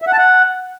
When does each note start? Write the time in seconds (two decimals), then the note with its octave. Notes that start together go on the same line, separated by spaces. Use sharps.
0.02 E5
0.07 F#5
0.13 A5
0.18 F#5